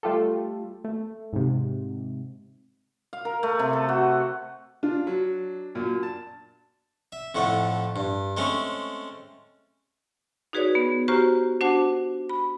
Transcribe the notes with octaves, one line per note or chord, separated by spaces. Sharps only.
G3 A3 F4 G4 A4
A3
G#2 C3
F5
A#4
A3
C3
A4
F#4
D4 F4
F#3
F#2 A#2
A5
E5
F2 A2 A3 F#5
G2
G#3 A3 C4 C#4
D#4 F#4 G#4 B4 C#5 D5
B3
F#4 G4 C5 A#5 C#6 F6
D4 F#4 C5 F#5 A5 D6
B5